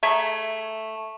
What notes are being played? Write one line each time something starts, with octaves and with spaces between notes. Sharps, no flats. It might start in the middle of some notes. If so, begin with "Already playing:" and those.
A3 G#4 E5 A#5